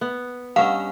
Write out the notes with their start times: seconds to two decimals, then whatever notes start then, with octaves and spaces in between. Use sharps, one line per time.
0.01 B3
0.56 G2 C#4 D#5 F5 F#5